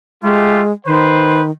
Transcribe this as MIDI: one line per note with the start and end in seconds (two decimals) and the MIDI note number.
0.23 0.72 56
0.23 0.62 57
0.23 0.62 65
0.23 0.62 67
0.86 1.51 51
0.86 1.41 71
0.86 1.41 72